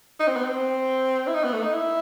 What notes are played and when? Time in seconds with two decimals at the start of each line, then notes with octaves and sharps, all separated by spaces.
0.20 D#4
0.28 C4
0.36 B3
0.44 C4
1.28 E4
1.35 D#4
1.44 B3
1.53 A3
1.63 D#4
1.73 E4